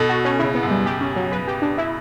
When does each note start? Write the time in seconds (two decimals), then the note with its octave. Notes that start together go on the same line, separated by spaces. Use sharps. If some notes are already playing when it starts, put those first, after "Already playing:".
Already playing: B2 A4
0.09 F#4
0.25 C#4
0.39 C#3 E4
0.55 B3
0.63 F#2
0.70 G3
0.86 G4
1.01 C#4
1.16 F#3
1.32 B4
1.47 G4
1.62 D4
1.78 E4